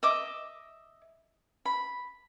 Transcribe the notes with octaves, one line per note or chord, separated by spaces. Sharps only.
D#5 E5 D6
B5